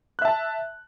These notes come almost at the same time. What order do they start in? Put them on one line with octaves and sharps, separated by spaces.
F#6 E5 A5